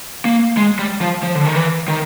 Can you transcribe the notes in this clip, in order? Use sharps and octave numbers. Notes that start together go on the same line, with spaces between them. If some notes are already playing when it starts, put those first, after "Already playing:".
A#3
G#3
G3
F3
F3
D3
D#3
E3
D#3